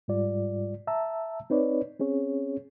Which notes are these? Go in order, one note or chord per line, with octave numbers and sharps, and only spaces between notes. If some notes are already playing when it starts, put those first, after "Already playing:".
G#2 G3 F4 D5
E5 A5 A#5 E6
C4 D#4 B4 C#5 D5
C4 C#4 G#4 C#5